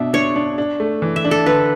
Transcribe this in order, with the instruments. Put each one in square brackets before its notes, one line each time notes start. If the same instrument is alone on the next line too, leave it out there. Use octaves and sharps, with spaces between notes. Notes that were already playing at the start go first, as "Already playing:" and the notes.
Already playing: [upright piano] B2 D4 [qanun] E5
[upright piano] D4 [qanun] C#5
[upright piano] D4
D4
A3
E3
[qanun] E5
[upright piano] D4
[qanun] A4
[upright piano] D3 [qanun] B4